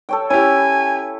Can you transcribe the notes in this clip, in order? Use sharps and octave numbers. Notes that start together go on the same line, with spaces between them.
A4 C#5 G5
C#4 E4 G4 G#5